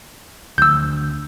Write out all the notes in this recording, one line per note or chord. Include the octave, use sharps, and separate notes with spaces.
D2 E6 G6